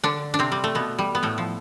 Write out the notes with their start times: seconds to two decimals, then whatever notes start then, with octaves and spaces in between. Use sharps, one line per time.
0.04 D3 D4
0.34 D4
0.39 C3 C4
0.52 G3
0.64 A3
0.75 B2 B3
0.99 G3
1.15 B3
1.23 A2 A3
1.38 F3